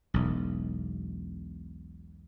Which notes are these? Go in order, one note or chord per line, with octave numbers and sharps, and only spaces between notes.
E1 B1